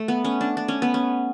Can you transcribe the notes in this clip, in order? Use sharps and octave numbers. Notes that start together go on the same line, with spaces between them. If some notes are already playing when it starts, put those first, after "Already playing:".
Already playing: A3
B3
C#4
D4
D4
C#4
B3
C#4